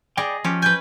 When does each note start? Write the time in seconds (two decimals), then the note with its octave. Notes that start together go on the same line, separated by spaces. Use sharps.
0.17 G#4 D5 D#5 G5
0.44 F3 C#4 G4
0.62 B4 G#5 G6